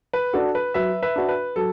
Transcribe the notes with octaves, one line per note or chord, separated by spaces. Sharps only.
B4
D4 F#4 A4
B4
F#3 B4 E5
B4 E5
D4 F#4
B4
F#3 A4